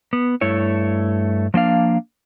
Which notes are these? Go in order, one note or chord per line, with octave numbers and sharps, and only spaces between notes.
B3
G2 A3 E4 C#5
F3 A#3 D4 F5